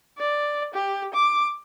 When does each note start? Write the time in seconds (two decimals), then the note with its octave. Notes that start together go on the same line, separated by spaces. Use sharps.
0.18 D5
0.74 G4
1.14 D6